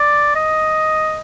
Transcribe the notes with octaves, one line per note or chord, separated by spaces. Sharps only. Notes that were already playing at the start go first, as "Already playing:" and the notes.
Already playing: D5
D#5